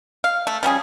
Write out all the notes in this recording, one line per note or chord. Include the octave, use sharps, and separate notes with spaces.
F5
A3
F3 G3 C#4 G#4